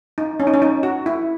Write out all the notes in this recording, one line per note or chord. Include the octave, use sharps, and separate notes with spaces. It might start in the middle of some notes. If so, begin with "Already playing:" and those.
D#4
C#4
D#4
C#4
D#4
F#4
E4